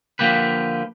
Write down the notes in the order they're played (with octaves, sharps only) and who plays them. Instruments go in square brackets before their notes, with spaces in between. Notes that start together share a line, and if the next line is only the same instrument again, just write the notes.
[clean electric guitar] D3 F3 A#3 G4 B4